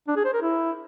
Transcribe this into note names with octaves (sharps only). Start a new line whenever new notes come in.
D4
G#4
C5
A#4
E4